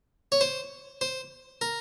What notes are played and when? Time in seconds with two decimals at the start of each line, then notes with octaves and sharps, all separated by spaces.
0.32 C#5
0.41 C5
1.01 C5
1.61 A#4